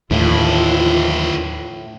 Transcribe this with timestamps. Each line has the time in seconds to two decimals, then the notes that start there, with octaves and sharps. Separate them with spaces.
0.11 D#2 A2 D3 E3 F3 E4 F4